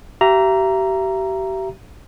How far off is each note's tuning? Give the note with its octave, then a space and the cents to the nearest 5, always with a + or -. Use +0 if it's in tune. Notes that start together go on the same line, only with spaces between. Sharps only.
G4 -35 E5 +35 A#5 +0